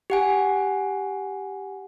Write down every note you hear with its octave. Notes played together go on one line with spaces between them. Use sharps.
G4 F#5 G#5